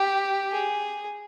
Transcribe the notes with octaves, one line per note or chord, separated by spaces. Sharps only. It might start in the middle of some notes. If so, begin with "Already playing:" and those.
Already playing: G4
G#4